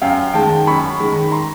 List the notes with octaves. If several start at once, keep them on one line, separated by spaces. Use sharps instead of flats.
F#2 F5 G5
D#3 G#3 G5 A5
F#2 B5 C#6
D#3 G#3
A#5 C6